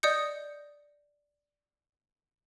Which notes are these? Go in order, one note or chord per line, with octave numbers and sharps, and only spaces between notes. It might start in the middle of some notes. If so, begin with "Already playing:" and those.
D5 D#5 D#6 G6 C#7